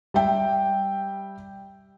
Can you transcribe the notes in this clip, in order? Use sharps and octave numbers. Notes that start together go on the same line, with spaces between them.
G3 E5 G5